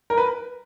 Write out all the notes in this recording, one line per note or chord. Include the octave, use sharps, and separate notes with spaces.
A#4
B4